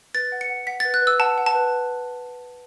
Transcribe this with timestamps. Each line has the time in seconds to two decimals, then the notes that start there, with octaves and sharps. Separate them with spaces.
0.14 B4 A6
0.32 F#5
0.41 C#7
0.49 F#5
0.67 F#5 B6
0.80 B4 A6
0.94 F#6
1.02 B4
1.07 E6
1.19 F#5 A5
1.38 F#5
1.46 A5
1.55 B4